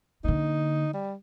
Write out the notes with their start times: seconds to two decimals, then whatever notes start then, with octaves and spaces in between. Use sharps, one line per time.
0.24 D3 A#3 D#4
0.94 G3